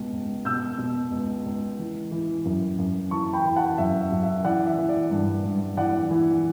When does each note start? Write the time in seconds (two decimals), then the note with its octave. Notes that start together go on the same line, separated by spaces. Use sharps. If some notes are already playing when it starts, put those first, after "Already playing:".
Already playing: C#2 B2
0.13 C#2
0.45 B2 E6 G6
0.78 B2
1.12 C#2
1.46 C#2
1.79 E3
2.12 E3
2.45 F#2
2.78 F#2
3.11 E3 A5 C#6
3.33 G5 B5
3.46 E3
3.56 F#5 A5
3.78 F#2 E5
4.01 E5
4.12 F#2
4.23 E5
4.44 E3 D5 F#5
4.67 E5
4.79 E3
4.89 D5
5.11 G2
5.45 G2
5.77 E3 D5 F#5
6.11 E3